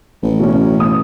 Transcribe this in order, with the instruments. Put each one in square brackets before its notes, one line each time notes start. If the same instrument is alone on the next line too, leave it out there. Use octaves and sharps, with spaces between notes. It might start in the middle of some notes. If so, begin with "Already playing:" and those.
[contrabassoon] A1
[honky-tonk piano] B2 C#4
D#6